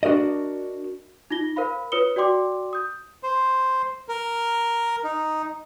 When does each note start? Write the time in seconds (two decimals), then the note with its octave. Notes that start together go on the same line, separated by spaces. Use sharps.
0.03 D4 F#4 A#4 D5 D#5
1.31 D#4 F4 A#6 G7
1.56 A#4 C5 F5 B5
1.92 F4 B4 C#5 D#6 C#7 G7
2.16 F#4 D5 G5 C6 D6
2.73 D#6 G6
3.23 C5
4.09 A#4
5.04 D#4